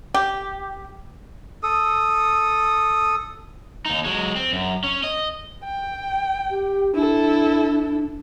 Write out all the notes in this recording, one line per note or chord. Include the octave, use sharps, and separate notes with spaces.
G4
A4 D#6
D#2 D#4
F#3 G#3
C4
F#2
C#4
D#5
G5
G4
D4 E4 A4